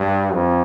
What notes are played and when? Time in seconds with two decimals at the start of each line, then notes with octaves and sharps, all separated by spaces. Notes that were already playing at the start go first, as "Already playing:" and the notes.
Already playing: G2
0.33 F2